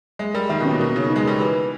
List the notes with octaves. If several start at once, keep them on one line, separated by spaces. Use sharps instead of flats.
G#3 E5
G3 A#4
D#3 E5
B2
C#4
A#2
B2 A#4
C#3 D#4
D#4
G#3
G3 A#4
E3 B4
B4